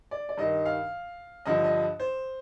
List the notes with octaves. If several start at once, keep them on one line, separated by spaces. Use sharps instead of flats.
D5
D5
G2 D#3 D#5
F5
G2 D3 F3 D#5
D#5
C5